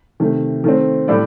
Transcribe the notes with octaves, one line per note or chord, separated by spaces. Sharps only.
C3 D#3 A3
D#3 A3 C4
A2 G3 D4 A4 D5